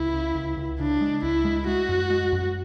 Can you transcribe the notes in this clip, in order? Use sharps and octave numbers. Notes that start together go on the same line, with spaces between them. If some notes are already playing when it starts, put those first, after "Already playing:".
Already playing: C#2 E4
C#3
C#2
C#2
C#3 D4
G#3
C#2 E4
G#3
G#3 F#4
F#2
G#3
F#2